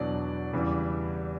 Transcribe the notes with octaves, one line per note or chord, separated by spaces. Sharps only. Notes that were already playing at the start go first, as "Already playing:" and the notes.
Already playing: E2 B2 F#3 B3 D4 D5
E2 C#3 E3 G3